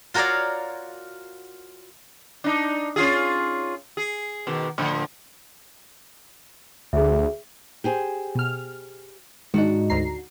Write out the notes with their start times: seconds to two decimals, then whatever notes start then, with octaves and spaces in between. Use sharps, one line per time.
0.14 F4 F#4 A#4 C#5 D5 F5
2.44 D4 D#4
2.96 C#4 F4 G#4
3.97 G#4
4.47 B2 D#3
4.78 A2 D3 F3
6.93 D2 G#4 E5
7.84 G4 G#4 C5
8.35 B2 F6
9.54 G#2 D#3 D4 D#4 F#4
9.90 D2 A#5 C7